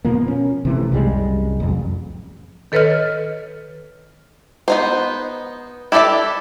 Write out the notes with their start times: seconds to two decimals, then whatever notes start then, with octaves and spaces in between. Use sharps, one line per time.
0.05 B2 F3 A#3
0.28 C#4
0.65 C3 E3 A3
0.92 C2 F#2 G3 G#3
1.60 A1 F2
2.72 D#3 A4 B4 C#5 D#5 F6
4.68 B3 D#4 C5
5.92 E4 G4 A4 D5 E5